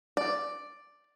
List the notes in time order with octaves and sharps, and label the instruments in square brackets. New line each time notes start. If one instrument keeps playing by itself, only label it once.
[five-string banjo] D5